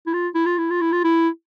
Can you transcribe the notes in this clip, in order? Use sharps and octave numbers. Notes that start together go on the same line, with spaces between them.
E4
F4
E4
F4
E4
F4
E4
F4
E4